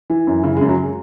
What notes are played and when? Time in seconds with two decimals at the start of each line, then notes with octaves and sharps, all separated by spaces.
0.10 E3
0.27 F#2
0.43 C#3 E4
0.57 G#3
0.61 F#2
0.69 F#3
0.83 G#3